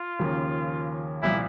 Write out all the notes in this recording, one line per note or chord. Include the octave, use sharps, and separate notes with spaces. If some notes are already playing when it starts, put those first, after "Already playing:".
Already playing: F4
D#2 C#3 F3 A#3
C2 A#2 F3 E4